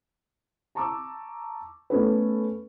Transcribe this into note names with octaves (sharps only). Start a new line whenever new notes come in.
A5 A#5 C#6 D6 E6
A3 B3 C#4 A4 B4